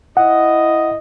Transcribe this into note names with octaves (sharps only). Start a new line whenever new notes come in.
E4 D#5 F#5